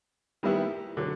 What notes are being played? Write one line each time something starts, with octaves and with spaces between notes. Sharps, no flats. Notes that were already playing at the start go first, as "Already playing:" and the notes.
D#3 G3 B3 E4 G4
D3 F#3